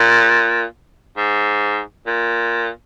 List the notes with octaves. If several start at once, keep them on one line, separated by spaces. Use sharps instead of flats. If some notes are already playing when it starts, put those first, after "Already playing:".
Already playing: A#2
G#2
A#2